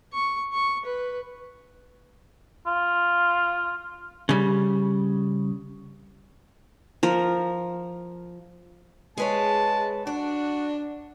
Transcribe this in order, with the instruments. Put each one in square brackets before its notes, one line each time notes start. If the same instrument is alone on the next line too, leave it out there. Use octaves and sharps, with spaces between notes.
[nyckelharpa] C#6
C#6
B4
[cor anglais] F4
[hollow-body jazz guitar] C#3 G3
[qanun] F3 A#4
[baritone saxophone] G#3 [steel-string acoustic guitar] G#4 B4 C#5 [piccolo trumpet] A5
[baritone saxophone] D4 [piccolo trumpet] F#4 [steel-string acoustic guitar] D5